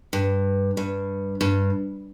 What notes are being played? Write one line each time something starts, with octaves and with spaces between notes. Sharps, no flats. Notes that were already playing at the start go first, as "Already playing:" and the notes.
G2
G2
G2